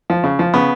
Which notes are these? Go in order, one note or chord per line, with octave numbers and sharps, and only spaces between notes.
F3
C#3
F3
C#3 B3